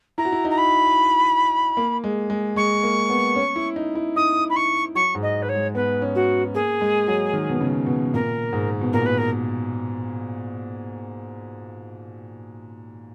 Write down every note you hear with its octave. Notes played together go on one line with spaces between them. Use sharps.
E4 A#5
F#4
E4
D#4
A#5
B5
A#3
G#3
G#3
G#3 C#6
A#3
B3
C#4
E4
D#4
E4
D#4 D#6
B5
C#6
F#3 C#6
G#2
D#5
B4
C#5
G#3
B3 B4
C#4
F#4
A#3 G#4
G#3
F#3
D#3
B2
C#3
B2
A#2 A#4
G#2
B2
A#2 A#4
B4
A#4